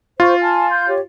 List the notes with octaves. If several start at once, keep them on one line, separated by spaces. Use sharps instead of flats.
F4 C5 C#6
G#5 A5 F6
C6 G6
G4 C#5